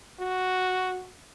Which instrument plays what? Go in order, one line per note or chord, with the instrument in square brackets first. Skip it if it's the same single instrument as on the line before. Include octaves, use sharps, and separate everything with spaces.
[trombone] F#4